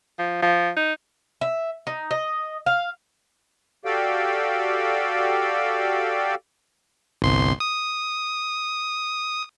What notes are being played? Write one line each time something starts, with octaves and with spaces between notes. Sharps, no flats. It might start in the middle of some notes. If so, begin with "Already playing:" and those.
F3
F3
D#4
E5
D#4
D#5
F5
F#4 G4 A4 D5 F5 G5
G1 C2 C6
D#6